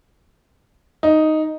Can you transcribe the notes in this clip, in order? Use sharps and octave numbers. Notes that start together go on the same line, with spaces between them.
D#4